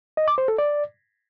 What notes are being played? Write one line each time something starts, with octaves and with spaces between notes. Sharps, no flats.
D#5
D6
C5
A4
D5